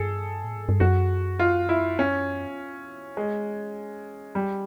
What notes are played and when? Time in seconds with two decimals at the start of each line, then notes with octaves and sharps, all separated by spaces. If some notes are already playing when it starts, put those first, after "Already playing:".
Already playing: G2 G#4 A4
0.44 A2
0.56 G#2
0.69 G2
0.80 F#2 F#4
1.39 F4
1.69 E4
1.99 C#4
3.17 G#3
4.35 G3